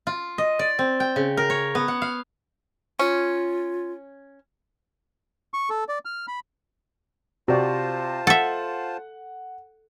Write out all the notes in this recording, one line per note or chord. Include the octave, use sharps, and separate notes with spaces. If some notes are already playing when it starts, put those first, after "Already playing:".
F4
D#5
D5
C4
G5
C#3
A#4
C#5
B3
F#5
F5
C#4 F4
C#6
A4
D5
F6
B5
C3 F4 F#4 C5 D5 A5
A4 E5 F#5